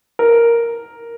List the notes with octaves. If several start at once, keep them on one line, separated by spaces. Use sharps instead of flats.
A#4